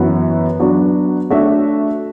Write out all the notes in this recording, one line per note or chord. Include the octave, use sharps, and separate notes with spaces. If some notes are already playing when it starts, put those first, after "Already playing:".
Already playing: F#2 E3 B3 F#4 B4
F#3 B3 D4 F#4
A3 D4 F#4 C#5 E5